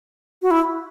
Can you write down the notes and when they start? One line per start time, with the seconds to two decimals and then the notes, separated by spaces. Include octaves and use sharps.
0.42 F#4
0.51 E4